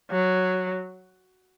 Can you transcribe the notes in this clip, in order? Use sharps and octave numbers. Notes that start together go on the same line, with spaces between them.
F#3